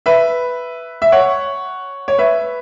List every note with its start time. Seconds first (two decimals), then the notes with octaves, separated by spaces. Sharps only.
0.06 B4 E5
1.02 E5
1.12 C#5 F#5
2.08 C#5
2.19 B4 E5